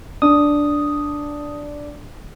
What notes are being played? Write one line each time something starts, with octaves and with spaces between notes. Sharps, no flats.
D4 D#6